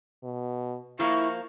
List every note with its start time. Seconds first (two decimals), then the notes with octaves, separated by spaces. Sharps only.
0.24 B2
1.00 F3 A#3 E4 C#6